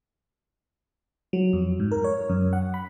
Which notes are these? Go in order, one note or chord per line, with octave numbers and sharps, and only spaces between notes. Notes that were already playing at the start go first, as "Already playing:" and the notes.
F#3
F2
G#2
A#4
C#5
F#2
F#5
B5